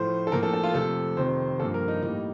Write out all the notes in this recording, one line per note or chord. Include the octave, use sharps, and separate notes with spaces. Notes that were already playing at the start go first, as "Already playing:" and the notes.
Already playing: A2 F3 A3 C5
A4
A2 F3 A#3 A#4
A4
A4
F4
F2 C3 F3 A3 A4
F2 C3 D#3 C5
G2 F3 A#3 A4
A#4
D#4
A2 G3 A#3 D#4